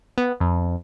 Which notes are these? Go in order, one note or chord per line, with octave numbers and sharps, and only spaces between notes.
B3
F2